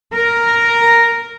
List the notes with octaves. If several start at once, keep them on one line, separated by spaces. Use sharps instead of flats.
A#4